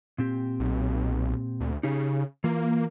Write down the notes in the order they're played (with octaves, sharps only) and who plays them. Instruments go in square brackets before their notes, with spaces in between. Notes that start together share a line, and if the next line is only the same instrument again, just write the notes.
[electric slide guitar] A#2 C4 G4
[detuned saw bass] B1
D2
[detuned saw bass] C#3 [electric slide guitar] D#4 G4 G#4
[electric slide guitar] E3 F4 [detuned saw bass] A#3